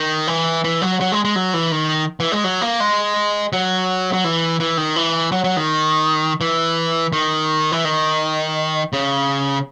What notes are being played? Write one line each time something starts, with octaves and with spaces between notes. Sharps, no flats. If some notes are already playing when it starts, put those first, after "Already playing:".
Already playing: D#3
E3
E3
F#3
F#3
G#3
G#3
F#3
E3
D#3
E3
G#3
F#3
A#3
G#3
F#3
F#3
E3
E3
D#3
E3
F#3
F#3
D#3
E3
D#3
E3
D#3
C#3